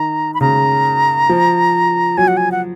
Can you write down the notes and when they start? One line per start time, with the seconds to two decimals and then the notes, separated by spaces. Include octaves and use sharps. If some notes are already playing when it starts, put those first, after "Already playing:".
Already playing: D#3 A#5
0.34 B5
0.41 C#3 A#5
1.29 F3
2.17 F#3 G#5
2.28 F#5
2.37 G#5
2.52 F#5